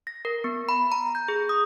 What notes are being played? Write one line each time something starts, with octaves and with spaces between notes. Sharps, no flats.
A#6
A#4
B3
B5
A#5
G6
G#4
D#6